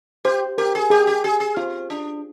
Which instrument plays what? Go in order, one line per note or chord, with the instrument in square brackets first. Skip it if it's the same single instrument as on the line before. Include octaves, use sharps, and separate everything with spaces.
[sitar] G4 [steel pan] C5
[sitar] G4 [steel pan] A#4
[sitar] G#4
[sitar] G4 [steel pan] G#4
[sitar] G4
G#4
G#4
[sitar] C4 [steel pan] F4
[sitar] D4